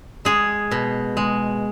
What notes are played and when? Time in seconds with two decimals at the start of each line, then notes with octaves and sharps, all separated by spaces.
0.25 G#3 G#4
0.71 B2
1.17 G#3